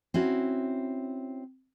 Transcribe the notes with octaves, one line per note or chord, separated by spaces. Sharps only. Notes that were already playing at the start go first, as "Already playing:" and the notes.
C4 C#4 E4 F#4